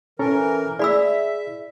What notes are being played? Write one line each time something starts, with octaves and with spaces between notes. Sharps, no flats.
E3 C#4 A4 A#4 A#5
E4 G#4 D5 E5 B5 E6